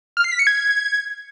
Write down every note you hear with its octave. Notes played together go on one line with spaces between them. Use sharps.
F6
C7
B6
C#7
G#6